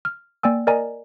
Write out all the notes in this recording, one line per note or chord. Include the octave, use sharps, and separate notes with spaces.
F6
A#3 D5 G5 G#5 E6
A#4 D5 D#5 G#5 A#5